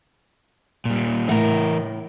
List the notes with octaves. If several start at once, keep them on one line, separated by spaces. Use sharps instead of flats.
A#2 G3
A2 E3 A#4 F#5